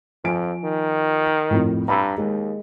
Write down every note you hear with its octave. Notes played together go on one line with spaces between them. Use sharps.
F2 F3 G#5 D7
D#3
F2 A2
G2 A#5 B5 E6
D#2 G#3